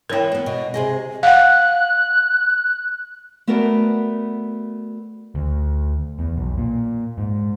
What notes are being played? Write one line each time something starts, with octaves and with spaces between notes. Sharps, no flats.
E3 E4 A#4 C#5 G5
A#3 B3
B2
C3 G#4 D#5
F5 F#5 F#6
A3 B3 F#4 A#4 D5
D2
E2
B1
A#2
G#2